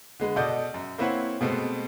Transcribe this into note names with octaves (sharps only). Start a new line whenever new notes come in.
D3 G#3 B4
B2 A4 D5 D#5 F#5 G6
F#2
A#3 C4 E4 B4 C#5 F#5
B2 G#3 A3 B3 C4